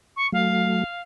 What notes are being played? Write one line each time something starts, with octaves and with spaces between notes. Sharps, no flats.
C#6
F#3 A3 F5